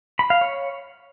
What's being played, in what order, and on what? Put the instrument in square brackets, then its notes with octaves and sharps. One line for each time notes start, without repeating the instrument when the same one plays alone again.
[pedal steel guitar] B5
F5
C#5